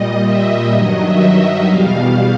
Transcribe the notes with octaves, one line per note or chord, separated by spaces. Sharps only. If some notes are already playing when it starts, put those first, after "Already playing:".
Already playing: A#2 G3 D#5
E5
G2 D#3 F#3 D#5
E5
E5
E2 B2 G3 F5